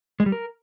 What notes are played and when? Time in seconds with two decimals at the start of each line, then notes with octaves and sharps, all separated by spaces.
0.20 G#3
0.26 G3
0.32 A#4